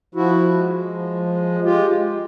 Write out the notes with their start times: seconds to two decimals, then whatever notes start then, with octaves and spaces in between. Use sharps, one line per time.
0.15 F3 E4 F#4
0.53 G#3
0.90 F3
1.26 G#3
1.64 G#3 F4 G4
2.01 G#3